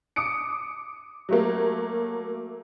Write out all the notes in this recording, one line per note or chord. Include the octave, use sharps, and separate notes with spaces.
D6 D#6 C#7 D7
F#3 A3 A#3